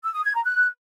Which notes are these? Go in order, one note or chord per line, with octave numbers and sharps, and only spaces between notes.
E6
D#6
G#6
A#5
F#6